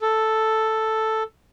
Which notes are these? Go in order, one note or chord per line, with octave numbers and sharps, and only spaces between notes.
A4